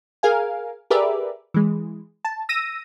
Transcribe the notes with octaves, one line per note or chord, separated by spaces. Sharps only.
G#4 A#4 F5 G#5
G4 G#4 A#4 B4 D5 E5
E3 G#3
A5
E6 A#6 D#7